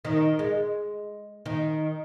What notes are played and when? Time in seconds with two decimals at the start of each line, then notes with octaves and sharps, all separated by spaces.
0.05 D#3
0.39 G#3
1.46 D#3